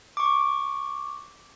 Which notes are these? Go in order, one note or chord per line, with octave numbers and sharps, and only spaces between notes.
C#6 D6